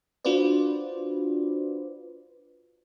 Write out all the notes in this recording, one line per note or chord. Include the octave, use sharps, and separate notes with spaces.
D4 F4 F#4 B4 C5 D5